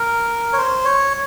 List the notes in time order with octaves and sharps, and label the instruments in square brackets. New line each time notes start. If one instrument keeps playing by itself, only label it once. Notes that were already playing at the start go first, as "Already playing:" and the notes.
Already playing: [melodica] A#4
C#5
C5
C#5